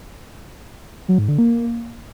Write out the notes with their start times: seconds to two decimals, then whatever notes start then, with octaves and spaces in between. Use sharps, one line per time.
1.08 F#3
1.18 G#2
1.28 D3
1.38 A#3